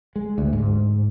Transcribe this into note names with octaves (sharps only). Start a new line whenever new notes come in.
G#3
D2
G#2